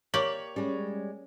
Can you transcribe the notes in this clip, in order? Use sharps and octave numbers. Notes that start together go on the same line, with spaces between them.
A#3 G4 C#5 D5 F#7
G3 G#3 C#4